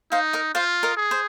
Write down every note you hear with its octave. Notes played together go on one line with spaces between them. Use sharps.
D#4 C5 F5
A#4 D#5
F4 C5 F5
A#4 D#5
G#4
C5